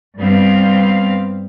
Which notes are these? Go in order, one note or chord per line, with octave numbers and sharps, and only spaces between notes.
G2 G3 B3 C4 F5